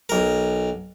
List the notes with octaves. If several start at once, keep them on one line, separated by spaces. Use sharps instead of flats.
B1 A#4